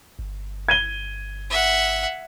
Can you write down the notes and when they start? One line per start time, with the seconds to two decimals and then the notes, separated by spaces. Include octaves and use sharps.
0.19 G1
0.68 G#6 D#7 G7
1.50 E5 F#5